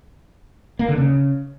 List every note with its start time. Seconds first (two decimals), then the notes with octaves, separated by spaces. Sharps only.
0.79 A#3
0.89 D3
0.98 C#3